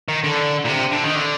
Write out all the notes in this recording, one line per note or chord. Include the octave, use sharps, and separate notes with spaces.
D#3
D3
A#2
C3
D3
D#3
D3